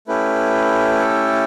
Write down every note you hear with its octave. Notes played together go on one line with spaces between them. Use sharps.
A3 C#4 E4 G4 B4
A4